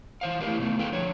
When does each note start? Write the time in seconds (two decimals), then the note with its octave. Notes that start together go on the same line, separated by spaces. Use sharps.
0.21 E3 C5 F5
0.40 A3 E4 F4 G4 A#4 F5
0.59 C3 A3 B3 C#4 D#4
0.79 G#4 A4 B4 F5 G5
0.92 D3 F3 C#5